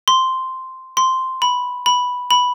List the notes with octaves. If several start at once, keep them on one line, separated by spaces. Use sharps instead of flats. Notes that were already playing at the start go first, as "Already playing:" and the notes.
C6
C6
B5
B5
B5